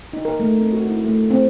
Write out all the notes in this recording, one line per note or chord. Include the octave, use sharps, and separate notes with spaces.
D#4
A#4
A3
C4
F#4
E4
A3
C4